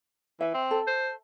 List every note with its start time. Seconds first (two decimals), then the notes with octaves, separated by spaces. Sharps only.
0.41 E3 E5
0.54 C4
0.71 A4
0.87 C5